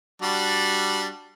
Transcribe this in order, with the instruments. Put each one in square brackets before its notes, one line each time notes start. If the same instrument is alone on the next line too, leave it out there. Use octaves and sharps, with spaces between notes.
[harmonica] G3 D4 F#4